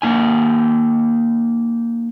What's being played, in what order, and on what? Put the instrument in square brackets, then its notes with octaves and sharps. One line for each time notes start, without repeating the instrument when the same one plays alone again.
[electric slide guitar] A#3 D#4 G#5